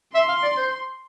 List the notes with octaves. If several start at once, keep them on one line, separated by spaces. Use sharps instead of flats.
E5 C6
F5
D5
C5